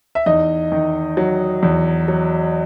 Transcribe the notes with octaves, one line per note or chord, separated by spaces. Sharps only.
E5
E2 D#4 D#5
D#3
F#3
E2
F#3